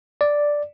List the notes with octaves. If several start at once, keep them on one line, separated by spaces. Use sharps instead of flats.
D5